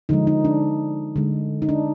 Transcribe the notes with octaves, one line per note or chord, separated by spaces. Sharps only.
D3 F3 G#3 D#4
D#4
D4
D3 G#3
D#4
D4